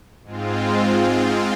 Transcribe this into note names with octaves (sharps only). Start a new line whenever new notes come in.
G#2 G#3 C4 F4